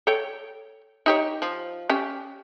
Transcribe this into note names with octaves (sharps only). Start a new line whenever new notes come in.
A4 C#5 G5
D#4 G4 C#5
F3
C#4 G4